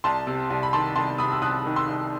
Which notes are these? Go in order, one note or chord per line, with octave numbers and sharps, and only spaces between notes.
C2 A5 C6
C3
C2
B5
D#3 A5 C6
C2 A5 C6
C3 B5 D#6
E6
C2 D#6 F#6
D#3
C6 E6
C2